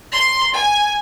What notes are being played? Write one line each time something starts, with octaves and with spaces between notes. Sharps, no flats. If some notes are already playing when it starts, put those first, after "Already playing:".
C6
G#5